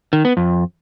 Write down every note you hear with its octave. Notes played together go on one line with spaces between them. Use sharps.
D#3
B3
F2